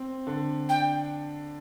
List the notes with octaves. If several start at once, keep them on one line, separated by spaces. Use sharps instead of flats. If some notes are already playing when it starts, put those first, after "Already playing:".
Already playing: C4
D3
D4 G5